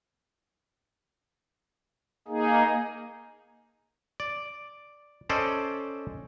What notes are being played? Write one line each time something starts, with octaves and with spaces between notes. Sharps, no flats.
A#3 D#4 G#4
D5
C#4 A4 C5 D5 D#5